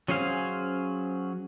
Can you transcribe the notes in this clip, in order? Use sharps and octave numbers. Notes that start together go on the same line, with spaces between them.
F#3 C#4 G#4 C5 F5